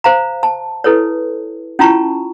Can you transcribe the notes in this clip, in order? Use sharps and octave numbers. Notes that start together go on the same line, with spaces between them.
C5 F5 A#5
A5
E4 A4 B4 C#5
C#4 E4 F4 A5 A#5 C#6